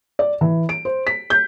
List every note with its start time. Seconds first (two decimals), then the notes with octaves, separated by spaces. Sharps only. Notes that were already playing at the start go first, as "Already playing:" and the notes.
0.19 D5
0.41 E3
0.69 D7
0.85 C5
1.07 B6
1.30 G6